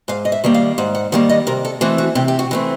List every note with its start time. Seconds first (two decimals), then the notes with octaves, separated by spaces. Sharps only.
0.08 G#2 F5
0.25 D#5
0.32 E5
0.44 D#3 G3 A#3
0.54 F5
0.78 G#2 F#5
0.95 F#5
1.12 D#3 G3 A#3 F5
1.30 D#5
1.47 C3 A#4
1.65 A4
1.81 E3 A3 C4 F#4
1.98 F#4
2.15 C3 G4
2.28 G4
2.39 F#4
2.51 E3 A3 C4